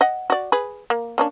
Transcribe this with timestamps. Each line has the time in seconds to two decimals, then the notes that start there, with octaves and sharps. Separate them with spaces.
0.01 D#5 F#5
0.30 F#4 D5
0.52 G#4 B4
0.90 A#3
1.18 A#3 C#4 D4